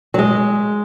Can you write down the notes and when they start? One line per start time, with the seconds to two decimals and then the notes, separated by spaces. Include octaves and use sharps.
0.14 F#3
0.19 G#3